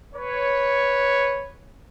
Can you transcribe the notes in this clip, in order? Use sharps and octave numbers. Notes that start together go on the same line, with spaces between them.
B4 C#5